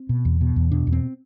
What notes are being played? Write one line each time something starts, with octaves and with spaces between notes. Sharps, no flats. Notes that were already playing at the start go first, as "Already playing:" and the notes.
Already playing: C4
B2
E2
B2
E2
B2 D4
E2
C4